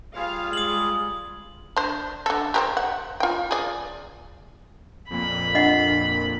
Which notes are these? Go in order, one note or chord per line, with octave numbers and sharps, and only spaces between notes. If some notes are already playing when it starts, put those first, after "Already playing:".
G3 F4 G#4 F5
G#3 D#6 F#7
D4 C5
D3 A4
G4 A#4 C5
F#5
F4 G5
G#4 D5
F2 A#2 B5
D4 D#5 F#5